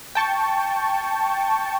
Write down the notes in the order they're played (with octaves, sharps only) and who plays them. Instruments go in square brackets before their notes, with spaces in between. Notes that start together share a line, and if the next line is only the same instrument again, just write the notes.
[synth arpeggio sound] G5 A5 C#6